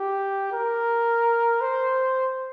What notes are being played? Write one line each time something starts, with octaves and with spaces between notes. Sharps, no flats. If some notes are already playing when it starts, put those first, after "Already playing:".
Already playing: G4
A#4
C5